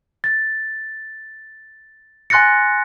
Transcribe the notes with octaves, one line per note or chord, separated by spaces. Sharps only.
A6
G#5 C6 F#6 A6 A#6 C#7